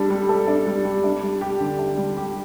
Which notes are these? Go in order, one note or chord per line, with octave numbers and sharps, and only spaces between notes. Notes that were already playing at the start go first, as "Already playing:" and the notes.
Already playing: G3 D4 A4
G3
A4
D4
G3
G3
D4
G3
G4
D3
D4
G3
G4